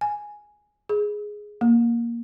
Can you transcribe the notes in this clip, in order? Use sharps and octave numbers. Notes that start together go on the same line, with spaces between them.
G#5
G#4
A#3